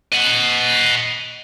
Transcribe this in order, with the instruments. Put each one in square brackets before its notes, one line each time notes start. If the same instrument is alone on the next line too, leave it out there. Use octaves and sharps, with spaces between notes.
[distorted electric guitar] D#5 F#5